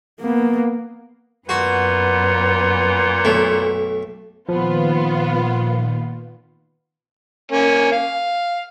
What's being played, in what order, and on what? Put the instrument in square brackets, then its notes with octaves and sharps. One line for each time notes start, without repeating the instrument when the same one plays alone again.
[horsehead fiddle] A#3 B3
[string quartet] F#2 B3 [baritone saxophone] A#2 [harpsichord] F#4
[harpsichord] B1 A3
[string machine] A#2 D#3 [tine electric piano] F3 [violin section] B3 F4
[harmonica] A#3 C#4
F5